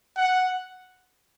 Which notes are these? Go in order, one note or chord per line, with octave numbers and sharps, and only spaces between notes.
F#5